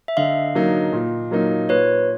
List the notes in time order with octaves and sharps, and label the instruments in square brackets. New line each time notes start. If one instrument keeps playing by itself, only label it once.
[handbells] E5
[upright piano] D3 [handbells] D#5 F5
[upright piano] F#3 A#3 D#4
A#2
F#3 A#3 D#4
[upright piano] A#2 [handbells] B4 C#5